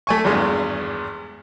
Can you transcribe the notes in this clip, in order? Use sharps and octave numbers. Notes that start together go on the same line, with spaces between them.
A3 G#5 C#6
G#1 E2 G2 G#3